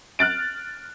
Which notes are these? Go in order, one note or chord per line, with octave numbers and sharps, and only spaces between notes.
F6 F#6 A6 D7